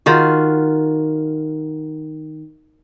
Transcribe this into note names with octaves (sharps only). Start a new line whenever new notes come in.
D#3 F4 F#4